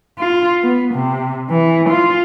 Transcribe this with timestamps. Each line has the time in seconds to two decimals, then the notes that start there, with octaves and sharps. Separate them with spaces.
0.19 F4
0.63 B3
0.95 C3
1.50 E3
1.90 F4